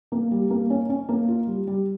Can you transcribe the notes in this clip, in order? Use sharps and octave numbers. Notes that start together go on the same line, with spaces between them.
A#3
G3
A#3
C#4
C#4
A#3
F4
G3
G3